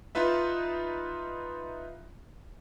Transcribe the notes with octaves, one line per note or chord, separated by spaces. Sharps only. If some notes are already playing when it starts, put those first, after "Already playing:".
D#4 F4 B4 E5